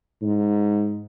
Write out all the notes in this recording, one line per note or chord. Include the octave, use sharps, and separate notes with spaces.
G#2